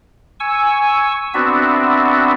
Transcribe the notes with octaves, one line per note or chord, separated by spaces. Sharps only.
G#5 C#6 E6
B3 C4 D4 F#4 E5